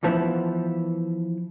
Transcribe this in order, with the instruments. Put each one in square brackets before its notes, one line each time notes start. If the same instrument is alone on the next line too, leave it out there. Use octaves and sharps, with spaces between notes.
[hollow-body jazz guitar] E3 F3 B3 E4